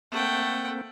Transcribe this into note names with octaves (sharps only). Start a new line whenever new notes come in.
A3 A#3 C4 F#5 G5